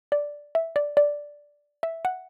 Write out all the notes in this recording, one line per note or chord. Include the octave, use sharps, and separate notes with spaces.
D5
E5
D5
D5
E5
F#5